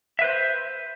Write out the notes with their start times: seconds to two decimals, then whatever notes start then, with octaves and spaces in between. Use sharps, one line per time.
0.19 E5
0.22 B4
0.24 C5